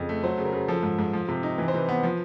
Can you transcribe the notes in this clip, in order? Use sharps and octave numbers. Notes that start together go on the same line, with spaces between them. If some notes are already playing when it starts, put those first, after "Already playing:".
Already playing: F2 C#3
A3
F#3 C5
C#3
A#4
C#3
F3 A4
G#2
G#2
F3
C3
D#4
E3 B4
C5
C3 B4
B3
F3